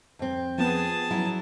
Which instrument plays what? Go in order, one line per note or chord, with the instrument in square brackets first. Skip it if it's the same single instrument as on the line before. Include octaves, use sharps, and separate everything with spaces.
[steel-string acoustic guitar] F2 C4
[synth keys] F3 B3 [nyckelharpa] G#4 A5
[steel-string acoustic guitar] F#3 C#4 E4